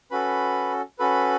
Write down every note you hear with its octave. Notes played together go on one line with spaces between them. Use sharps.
C#4 F#4 A4 B4 B5
C#4 F#4 A4 B4 B5